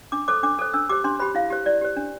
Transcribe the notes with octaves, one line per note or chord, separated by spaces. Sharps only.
D4 D6
A4 C5 D6
D4 D6
A4 C5
D4 E6
G4 C5 D6
D4 C6
G4 C5 B5
E4 F5
G4 C5
E4 D5
G4 C5
D4